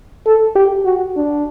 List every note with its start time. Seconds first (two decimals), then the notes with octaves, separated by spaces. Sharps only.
0.26 A4
0.55 G4
0.85 F#4
1.17 D4